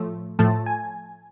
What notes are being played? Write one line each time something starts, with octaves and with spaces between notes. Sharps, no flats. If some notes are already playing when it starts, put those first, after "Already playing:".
Already playing: A2 F3 A3
A2 F3 A3 A5
G#5